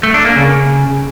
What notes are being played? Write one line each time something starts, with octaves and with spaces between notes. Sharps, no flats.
A3
D4
A#3
C#3